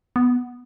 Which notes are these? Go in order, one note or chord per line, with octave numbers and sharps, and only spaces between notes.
B3